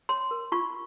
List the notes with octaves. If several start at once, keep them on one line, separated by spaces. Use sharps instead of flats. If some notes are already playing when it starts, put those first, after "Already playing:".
C#5 C6
A#4
F4 C#6